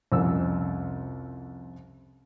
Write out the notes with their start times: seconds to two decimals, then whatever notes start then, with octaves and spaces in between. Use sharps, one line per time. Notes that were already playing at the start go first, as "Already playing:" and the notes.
0.12 C2 F2 C#4 E6